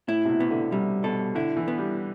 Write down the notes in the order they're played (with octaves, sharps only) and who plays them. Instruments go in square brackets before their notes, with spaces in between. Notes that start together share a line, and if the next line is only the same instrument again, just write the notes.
[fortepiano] A2 [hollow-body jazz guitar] E4
[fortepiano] C3
B2
[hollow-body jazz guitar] B3
[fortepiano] D3
[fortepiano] C3 [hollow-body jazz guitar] G3
[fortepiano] B2 [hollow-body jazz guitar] A4
[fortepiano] D3 [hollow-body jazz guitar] E4
[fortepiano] E3
[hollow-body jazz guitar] B3
[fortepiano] G3